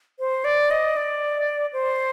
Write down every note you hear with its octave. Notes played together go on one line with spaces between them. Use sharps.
C5
D5
D#5
D5
C5